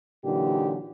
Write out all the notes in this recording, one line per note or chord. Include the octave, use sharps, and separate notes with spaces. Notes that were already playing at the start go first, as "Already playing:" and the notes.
A#2 D3 E3 F#3 D#4 G4